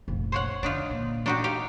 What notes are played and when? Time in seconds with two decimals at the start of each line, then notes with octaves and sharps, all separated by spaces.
0.08 F1 A#1
0.32 C5 C#5 F#5
0.63 D3 D4 D#4 F4
0.91 A#2
1.26 D4 D#4 F#4 G4
1.44 G4 F5